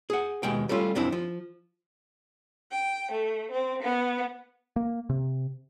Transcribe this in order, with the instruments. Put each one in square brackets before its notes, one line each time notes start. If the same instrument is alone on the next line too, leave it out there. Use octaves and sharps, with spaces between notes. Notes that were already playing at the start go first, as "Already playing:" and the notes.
[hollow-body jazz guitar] G#4 F#5
D#2 B2 G#3 G5
G3 A3 C#4 F4
C2 F#2 C4 D4 E4
F3
[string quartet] G5
A3
C4
B3
[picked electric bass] A#3
C3